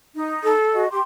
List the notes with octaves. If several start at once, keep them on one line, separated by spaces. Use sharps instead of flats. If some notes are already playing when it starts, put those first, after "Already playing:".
D#4
A4
F#4 D#5
G4 C6